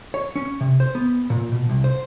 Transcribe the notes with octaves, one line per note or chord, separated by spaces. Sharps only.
C#5
C#4
C3
C5
B3
A#2
B2
C2
C5